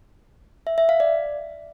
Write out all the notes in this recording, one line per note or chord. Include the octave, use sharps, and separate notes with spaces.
E5
E5
F5
D5